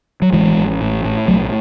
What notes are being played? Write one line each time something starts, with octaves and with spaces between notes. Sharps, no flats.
F#3
A1 E3 G#3
A1
A2
A2
B1 F#3 A3